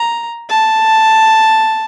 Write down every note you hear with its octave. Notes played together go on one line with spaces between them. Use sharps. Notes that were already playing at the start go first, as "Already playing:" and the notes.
Already playing: A#5
A5